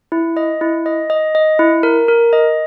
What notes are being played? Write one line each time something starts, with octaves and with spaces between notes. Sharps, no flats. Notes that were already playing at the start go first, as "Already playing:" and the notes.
E4
D#5
E4
D#5
D#5
D#5
E4
A#4
A#4
D#5